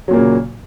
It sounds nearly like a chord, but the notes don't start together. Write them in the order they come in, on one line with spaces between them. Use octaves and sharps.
F#3 A#2 A#3 C#3